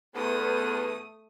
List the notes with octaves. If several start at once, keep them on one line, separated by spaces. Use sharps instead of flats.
E2 A3 B3 A4 D#6